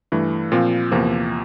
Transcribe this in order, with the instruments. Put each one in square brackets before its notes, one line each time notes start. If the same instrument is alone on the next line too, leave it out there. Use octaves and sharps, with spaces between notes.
[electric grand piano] G2 E3 A3
A#2 F3 C4 F4
E2 C3 F3 A#3